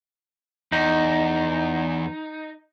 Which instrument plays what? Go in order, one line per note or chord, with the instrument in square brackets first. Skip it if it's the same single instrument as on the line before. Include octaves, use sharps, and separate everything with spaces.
[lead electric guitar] E2 [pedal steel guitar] D#4